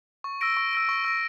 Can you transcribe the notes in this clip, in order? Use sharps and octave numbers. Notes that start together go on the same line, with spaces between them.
C#6
E6 A#6 D7
C#6
E6 A#6 D7
C#6
E6 A#6 D7